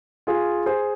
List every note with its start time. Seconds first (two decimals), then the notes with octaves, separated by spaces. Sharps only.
0.27 F4 G#4
0.66 G#4 C5